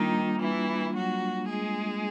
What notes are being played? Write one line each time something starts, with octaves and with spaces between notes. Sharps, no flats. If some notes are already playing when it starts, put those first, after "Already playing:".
Already playing: D#3 G3 A#3 D4 D#4 F4
E3 E4
F#3 F#4
G#3 G#4